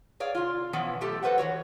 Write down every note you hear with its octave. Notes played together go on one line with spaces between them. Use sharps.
G#4 C#5 D5 F5
C3 F4
B2 E3 F3 B3 C#4 E4
F#2 A3 G4 A4
F#4 A4 B4 C5 E5 F#5
E3 G3 F#4 C#5